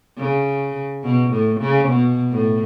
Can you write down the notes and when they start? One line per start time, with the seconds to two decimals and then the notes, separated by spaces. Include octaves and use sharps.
0.18 C#3
1.04 B2
1.31 A2
1.60 C#3
1.89 B2
2.32 A2